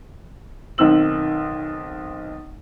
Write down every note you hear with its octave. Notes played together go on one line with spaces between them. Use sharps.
B1 D#3 C4 E6 F#7